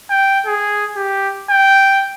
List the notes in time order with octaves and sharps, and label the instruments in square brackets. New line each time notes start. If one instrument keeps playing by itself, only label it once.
[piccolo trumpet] G5
G#4
G4
G5